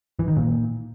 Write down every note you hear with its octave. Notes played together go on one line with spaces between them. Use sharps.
E3
D#3
A#2